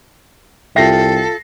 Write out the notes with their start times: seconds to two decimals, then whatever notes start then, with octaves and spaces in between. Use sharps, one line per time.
0.76 C2 F4 A4 E5 G5 A#6 C7